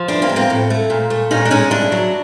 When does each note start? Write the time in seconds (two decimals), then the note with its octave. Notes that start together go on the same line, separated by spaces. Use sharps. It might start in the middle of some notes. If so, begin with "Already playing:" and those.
Already playing: F3
0.08 E2 D4 E4
0.22 A#3 C4
0.29 G#3
0.36 A#3 C4
0.50 A2
0.70 A3
0.90 A#2
1.10 A3
1.31 A#2 C#4 D#4
1.45 D4
1.51 G#3 C#4 D#4
1.70 G2 D4 E4
1.92 F#3